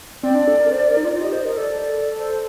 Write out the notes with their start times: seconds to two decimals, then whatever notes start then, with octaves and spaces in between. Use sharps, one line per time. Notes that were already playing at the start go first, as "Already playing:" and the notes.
0.23 C4 D5
0.35 D4
0.47 A4
0.60 A#4
0.72 C5
0.88 A#4
0.97 D#4
1.05 F4
1.20 G4 D#5
1.32 C5 D#5
1.45 A#4 D#5
1.57 A4 D5
2.18 C5